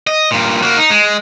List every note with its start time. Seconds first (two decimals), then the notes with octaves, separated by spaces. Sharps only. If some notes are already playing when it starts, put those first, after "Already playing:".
0.07 D#5
0.31 G2 A#2
0.62 A#3 F#4
0.77 D#4
0.90 G#3